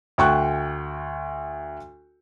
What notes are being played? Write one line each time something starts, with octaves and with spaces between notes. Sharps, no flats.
D2 G5 C#6 F#6